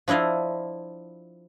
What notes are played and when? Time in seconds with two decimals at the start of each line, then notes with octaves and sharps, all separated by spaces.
0.08 F3 D4 E4 D#5 F5